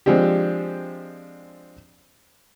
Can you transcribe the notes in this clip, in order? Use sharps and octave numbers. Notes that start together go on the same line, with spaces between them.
F3 G#3 C4 D4 G4